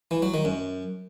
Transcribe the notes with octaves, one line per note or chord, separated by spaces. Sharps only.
E3
F#3
D#3
F#2